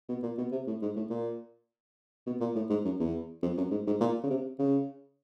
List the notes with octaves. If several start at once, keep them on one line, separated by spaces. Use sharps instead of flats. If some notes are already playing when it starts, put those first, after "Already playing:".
B2
A#2
B2
C3
A2
G#2
A2
A#2
B2
A#2
A2
G#2
F#2
E2
F2
F#2
G#2
G#2
A#2
C#3
C3
C#3